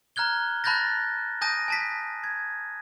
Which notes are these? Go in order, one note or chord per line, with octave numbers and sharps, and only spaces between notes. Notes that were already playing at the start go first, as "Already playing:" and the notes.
A#5 F6 F#6 G#6 G7
A5 B5 F#6 G6 A6 A#6
G#5 A5 D#6 G6 A#6 D#7
G#5 A5 B6
G#6